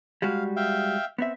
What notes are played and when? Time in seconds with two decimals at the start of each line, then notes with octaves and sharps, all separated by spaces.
0.22 G3 G#3 F#4 F5
0.56 E5 F5 G5
1.18 B3 C4 E5